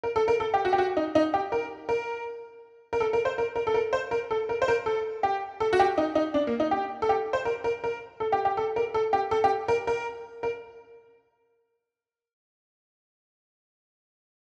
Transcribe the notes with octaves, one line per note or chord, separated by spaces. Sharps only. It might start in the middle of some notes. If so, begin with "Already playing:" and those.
A#4
A4
A#4
A4
G4
F#4
G4
F#4
D#4
D#4
G4
A#4
A#4
A#4
A4
A#4
C5
A#4
A#4
A4
A#4
C5
A#4
A4
A#4
C5
A#4
A4
G4
A4
F#4
G4
D#4
D#4
D4
A#3
D#4
G4
A4
G4
C5
A#4
A#4
A#4
A4
G4
G4
A4
A#4
A4
G4
A4
G4
A#4
A#4
A#4